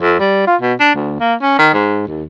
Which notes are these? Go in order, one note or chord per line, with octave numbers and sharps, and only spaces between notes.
F2
G3
F4
B2
D4
D2
A#3
C#4
D#3
G#2
D#2